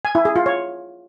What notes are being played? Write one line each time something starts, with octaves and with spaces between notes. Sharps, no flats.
G#5
E4
G#4
F4
C#5